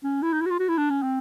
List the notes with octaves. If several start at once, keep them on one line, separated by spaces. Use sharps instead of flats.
C#4
E4
D#4
E4
F#4
F4
F#4
E4
D4
C#4
C4